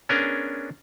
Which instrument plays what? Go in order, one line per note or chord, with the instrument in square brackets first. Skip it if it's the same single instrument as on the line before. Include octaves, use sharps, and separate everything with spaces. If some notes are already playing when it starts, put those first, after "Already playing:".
[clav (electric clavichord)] B3 C#4 D4 G#4 A#4